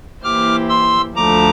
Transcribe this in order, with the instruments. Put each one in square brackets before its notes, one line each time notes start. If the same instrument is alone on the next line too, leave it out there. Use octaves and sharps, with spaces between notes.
[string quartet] E3 A#3 E4 G4 C5 [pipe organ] D6 F6
[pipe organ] C6 E6
[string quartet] D2 D3 F3 A3 [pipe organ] A#5 D6